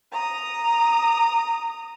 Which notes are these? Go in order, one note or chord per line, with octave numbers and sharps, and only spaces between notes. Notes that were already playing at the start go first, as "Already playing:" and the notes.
A#5 D#6